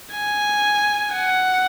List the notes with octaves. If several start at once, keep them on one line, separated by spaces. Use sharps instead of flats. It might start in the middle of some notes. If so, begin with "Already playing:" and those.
G#5
F#5